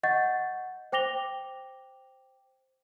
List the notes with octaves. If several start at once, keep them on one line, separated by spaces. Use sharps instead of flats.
D#5 F#5 C#6 G6 A6
C5 G5 D6 A#6 F7 G7